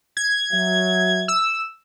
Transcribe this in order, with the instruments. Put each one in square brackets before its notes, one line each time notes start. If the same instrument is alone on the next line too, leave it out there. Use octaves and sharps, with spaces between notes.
[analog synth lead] G#6
[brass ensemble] F#3 E5
[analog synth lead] E6